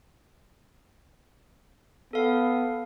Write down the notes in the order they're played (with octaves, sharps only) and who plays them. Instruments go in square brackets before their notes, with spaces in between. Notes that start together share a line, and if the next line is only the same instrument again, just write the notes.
[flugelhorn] B3 [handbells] A4 F5